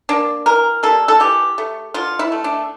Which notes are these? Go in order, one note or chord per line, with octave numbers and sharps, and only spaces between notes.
A#3 D4
E3 A#4
G3 A#3 A4
A4
E3 G4
A3
D3 F4
E4
A3
D4